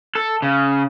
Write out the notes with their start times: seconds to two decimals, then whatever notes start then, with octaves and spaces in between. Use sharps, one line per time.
0.15 A4
0.42 C#3